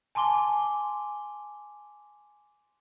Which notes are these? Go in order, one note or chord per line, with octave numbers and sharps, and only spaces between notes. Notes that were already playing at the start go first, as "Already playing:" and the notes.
G#5 A5 C6 D6 G7